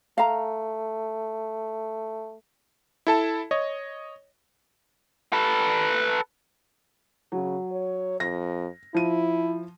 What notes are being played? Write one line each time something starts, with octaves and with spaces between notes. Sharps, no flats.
A3 F5 A#5
E4 A4 A5
C#5 D#5
A4 B4
C#3 F#3
C#5
F2 A#6
F3 E4 D#7